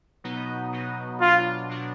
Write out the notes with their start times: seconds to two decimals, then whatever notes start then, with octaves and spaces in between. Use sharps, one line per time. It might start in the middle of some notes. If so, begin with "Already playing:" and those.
0.24 B2 F#3 B3 D#4
0.73 B2 F#3 B3 D#4
1.21 B2 F#3 D4 F4
1.69 B2 F#3 D4